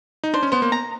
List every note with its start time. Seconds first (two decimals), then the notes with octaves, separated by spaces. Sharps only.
0.24 D#4
0.34 D4 C5
0.43 C#4
0.52 B3 C5
0.62 A#3
0.72 A#5